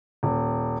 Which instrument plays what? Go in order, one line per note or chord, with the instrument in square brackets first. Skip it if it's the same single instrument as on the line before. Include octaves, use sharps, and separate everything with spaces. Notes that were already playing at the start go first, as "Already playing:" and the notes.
[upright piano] D#1